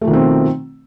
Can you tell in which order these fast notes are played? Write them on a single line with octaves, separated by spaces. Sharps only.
A3 F3 D#3 B2 C4